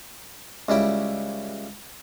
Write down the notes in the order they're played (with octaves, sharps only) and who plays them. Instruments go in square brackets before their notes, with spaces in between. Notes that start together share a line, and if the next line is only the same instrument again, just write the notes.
[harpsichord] C#2 G3 E4 G5